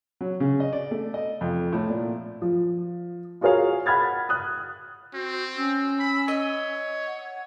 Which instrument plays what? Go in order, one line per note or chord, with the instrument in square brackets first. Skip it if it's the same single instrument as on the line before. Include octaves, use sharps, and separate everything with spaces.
[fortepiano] F#3
C#3
D#5
D5
A3
D#5
F2
A2
A#2
[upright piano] F3
F4 F#4 G#4 A#4 C#5 F5
F#5 B5 F6 G#6 A6
D#6 F#6
[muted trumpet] C4 [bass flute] F#4
[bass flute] C#4 [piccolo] E6
[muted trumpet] B5
[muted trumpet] C#5 [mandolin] D#5
[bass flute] F#5